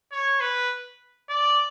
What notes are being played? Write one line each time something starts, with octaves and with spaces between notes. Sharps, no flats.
C#5
B4
D5